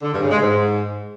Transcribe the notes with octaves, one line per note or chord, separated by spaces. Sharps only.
D3
G2
C#3
G#3
G#2